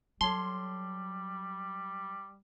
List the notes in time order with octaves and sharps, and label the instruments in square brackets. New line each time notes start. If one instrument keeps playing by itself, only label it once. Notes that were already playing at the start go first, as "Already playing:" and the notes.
[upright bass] F#3 [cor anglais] G3 [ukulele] A4 C#5 A5 [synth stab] C6